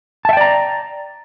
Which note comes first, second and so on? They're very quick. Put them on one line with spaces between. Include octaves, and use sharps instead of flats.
A5 E5 G5 D5 A#5